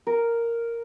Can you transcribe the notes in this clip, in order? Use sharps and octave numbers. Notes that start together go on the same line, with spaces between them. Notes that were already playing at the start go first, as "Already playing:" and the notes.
A#4